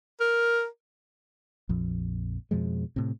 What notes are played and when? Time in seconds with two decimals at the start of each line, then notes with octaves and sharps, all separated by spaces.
0.20 A#4
1.69 A#1 F2
2.51 F2 B2 F3 G#3
2.96 A2 C3